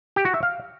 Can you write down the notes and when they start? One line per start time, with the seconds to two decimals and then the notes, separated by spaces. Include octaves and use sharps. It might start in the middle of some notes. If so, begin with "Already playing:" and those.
0.16 G4
0.25 F#4
0.34 E5
0.43 F5